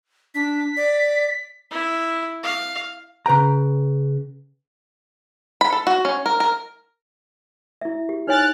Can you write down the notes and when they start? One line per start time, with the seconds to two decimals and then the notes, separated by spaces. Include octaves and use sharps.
0.35 D4 B6
0.77 D5
1.71 E4
2.43 F5
3.26 C#3 B4 G5 A#5
5.61 B5
5.72 A4
5.87 F#4
6.05 C#4
6.26 A#4
6.40 A#4
7.81 E4 E5
8.09 G4
8.27 D#4 C#5 G#5 F6 F#6 A6